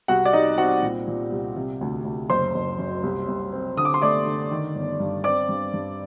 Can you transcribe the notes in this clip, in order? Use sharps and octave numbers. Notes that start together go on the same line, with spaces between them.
C2 F#4 F#5
D5
G3 D#4 D#5
C4 F#4 F#5
A#2
A#2
C2
C3
D2
D2
F#1 C5 C6
F#1
F#2
C2
C2
C4
D3 D#6
D6
C6
A3 D5 D6
D3
D#3
G1
G2
C4 D5 D6
G2
G2